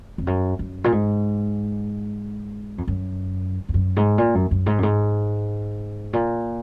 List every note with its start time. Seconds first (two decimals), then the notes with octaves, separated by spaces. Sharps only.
0.18 F2
0.27 F#2
0.59 F#2
0.84 A#2
0.92 G#2
2.78 F2
2.88 F#2
3.69 F2
3.74 F#2
3.96 G#2
4.18 A#2
4.35 F#2
4.51 F#2
4.66 G#2
4.78 F#2
4.83 G#2
6.13 A#2